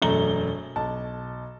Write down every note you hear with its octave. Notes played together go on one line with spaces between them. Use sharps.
E1 F#2 A3 A#5 G7
B1 A5